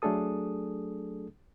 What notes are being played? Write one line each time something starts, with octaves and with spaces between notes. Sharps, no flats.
F#3 A3 D4 G#4 A4 D#6